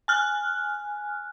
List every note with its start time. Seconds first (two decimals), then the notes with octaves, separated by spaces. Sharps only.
0.08 G#5 F6 F#6